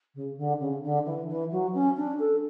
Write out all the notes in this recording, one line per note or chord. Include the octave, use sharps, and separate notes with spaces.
C#3
D3
C#3
D3
E3
E3
F#3
C#4
D4
A4